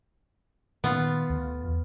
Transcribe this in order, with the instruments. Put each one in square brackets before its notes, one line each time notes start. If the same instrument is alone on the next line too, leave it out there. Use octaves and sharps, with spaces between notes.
[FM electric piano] A#2 D#3 [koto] B3 F4
[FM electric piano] D2
E2